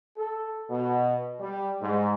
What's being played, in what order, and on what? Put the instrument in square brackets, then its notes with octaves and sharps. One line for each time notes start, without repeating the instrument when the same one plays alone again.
[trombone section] A4
B2
G3
G#2